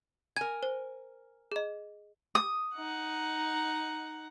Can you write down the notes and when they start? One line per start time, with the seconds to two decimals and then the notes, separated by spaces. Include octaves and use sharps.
0.36 A#4 G#5 G#6
0.63 C5
1.52 G#4 D#5
2.35 D#6
2.75 D#4 F#5